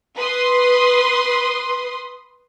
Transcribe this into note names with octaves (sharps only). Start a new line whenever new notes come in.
B4 C6 D#6